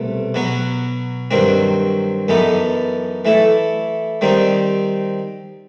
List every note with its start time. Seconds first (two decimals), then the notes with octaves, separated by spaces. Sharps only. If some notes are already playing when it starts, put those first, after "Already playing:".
Already playing: C2 B2 A3
0.34 B2 F#3 B3 F#4
1.31 G2 D#3 F#3 C4 F#4
2.28 F#2 E3 B3 D#4 A4
3.25 E3 A3 E4 A4
4.21 D#3 G3 C4 D#4